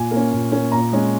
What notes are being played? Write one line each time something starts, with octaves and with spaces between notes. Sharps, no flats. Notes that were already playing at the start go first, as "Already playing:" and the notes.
Already playing: A#2 G#5
A#3 C#4
A#2
A#3 C#4
A#2 A#5
G#3 C#4